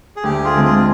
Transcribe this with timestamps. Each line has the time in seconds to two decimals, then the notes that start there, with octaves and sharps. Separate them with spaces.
0.16 G#4
0.23 D2 G4
0.44 F4 G#4
0.54 D3 G#3 C4
0.65 F4 G#4